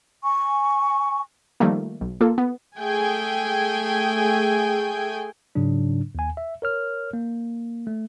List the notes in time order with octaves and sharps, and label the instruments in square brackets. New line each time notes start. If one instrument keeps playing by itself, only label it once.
[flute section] G#5 C#6
[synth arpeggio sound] D#3 F3 G3 A3 A#3
B1
A#3 F4 A4
B3
[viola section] A3 G#4 G5 G#5
[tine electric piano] G#2 C#3 F#3 D4
D#2 G#5
E5
A#4 C#5 F6
A#3
A3